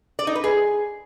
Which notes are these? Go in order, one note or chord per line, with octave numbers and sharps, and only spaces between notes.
D5
D#4
B4
G#4